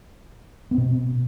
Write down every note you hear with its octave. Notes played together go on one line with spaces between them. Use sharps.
B2 B3 C4